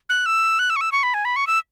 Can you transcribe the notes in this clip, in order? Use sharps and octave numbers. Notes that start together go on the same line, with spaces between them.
F#6
E6
F#6
E6
C#6
E6
C#6
B5
G#5
B5
C#6
E6